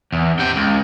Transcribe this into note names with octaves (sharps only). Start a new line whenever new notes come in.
E2
C3 G5
C#2